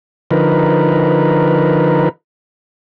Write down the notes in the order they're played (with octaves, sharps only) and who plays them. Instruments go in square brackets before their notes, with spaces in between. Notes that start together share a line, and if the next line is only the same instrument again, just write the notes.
[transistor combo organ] D3 F3 D#4 A#4 B4